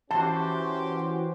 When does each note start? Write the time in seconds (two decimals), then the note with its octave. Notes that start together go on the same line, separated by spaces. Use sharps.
0.11 E3 C#4 F#4 G4 C5 A5